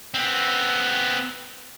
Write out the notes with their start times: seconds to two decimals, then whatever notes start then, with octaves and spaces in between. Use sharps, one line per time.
0.14 B3 C4